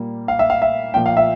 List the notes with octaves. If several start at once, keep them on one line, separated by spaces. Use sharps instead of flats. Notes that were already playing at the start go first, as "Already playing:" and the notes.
Already playing: A#2 G3 A#3
F5
E5
F5
E5
A#2 F3 A#3 G5
F5
E5